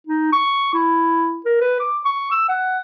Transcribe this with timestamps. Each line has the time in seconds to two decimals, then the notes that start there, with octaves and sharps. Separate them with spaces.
0.07 D#4
0.32 C#6
0.74 E4
1.45 A#4
1.61 B4
1.80 D6
2.05 C#6
2.31 E6
2.48 F#5